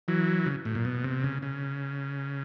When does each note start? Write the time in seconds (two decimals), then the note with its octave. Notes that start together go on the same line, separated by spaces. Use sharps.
0.08 E3 F#3
0.46 C#3
0.65 A2
0.75 A#2
0.85 B2
1.04 C3
1.24 C#3
1.42 C#3